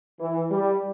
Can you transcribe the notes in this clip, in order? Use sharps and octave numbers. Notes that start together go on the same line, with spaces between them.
E3
G3